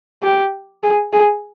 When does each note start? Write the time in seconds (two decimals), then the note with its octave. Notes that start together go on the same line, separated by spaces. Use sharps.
0.23 G4
0.83 G#4
1.13 G#4